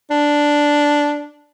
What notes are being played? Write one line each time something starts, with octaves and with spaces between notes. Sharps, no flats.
D4